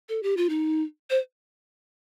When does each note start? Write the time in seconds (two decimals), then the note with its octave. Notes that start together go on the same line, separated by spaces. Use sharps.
0.09 A4
0.23 G4
0.37 F4
0.49 D#4
1.10 C5